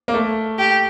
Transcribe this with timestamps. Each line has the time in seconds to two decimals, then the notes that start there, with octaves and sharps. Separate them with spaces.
0.08 A#3
0.14 A3
0.59 G4